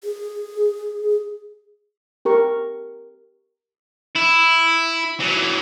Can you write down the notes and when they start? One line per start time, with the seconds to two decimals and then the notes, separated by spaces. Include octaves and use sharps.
0.04 G#4
2.25 G4 A#4 C#6
4.15 E4
5.20 E3 F#3